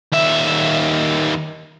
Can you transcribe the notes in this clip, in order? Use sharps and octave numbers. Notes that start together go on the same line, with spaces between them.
D#2 E5